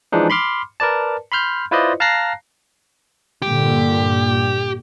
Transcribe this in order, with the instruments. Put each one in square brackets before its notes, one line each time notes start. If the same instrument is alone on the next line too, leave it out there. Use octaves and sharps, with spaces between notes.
[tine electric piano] E3 F3 G#3 D4 D#4
B5 C6 D6 F6
A#4 B4 D5 A5
B5 C6 F6 G6
E4 F4 B4 C5 D5 D#5
F5 A5 A#5 F#6 A#6 C7
[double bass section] G2 A#2 D3 [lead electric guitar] G4